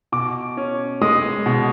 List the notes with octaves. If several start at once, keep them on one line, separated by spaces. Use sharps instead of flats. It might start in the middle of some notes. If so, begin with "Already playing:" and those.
B2 D6
C#4
G#3 D#6
B2